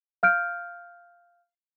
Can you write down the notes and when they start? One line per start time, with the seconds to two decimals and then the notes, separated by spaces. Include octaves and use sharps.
0.23 F5 F6 G6 D7